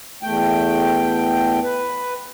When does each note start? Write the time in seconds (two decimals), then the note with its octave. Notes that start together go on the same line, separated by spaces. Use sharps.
0.23 E2 A3 G5
1.63 B4